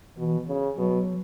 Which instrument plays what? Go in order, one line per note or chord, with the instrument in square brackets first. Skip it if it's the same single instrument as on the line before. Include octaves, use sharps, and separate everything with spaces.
[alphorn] B2 [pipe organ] E3
[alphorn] C#3
[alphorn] B2 [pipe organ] F#3